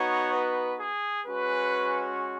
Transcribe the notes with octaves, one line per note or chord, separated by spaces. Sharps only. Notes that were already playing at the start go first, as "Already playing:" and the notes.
Already playing: B3 D#4 F#4 C#5
B4
G#4
G#3 C#4 F#4 B4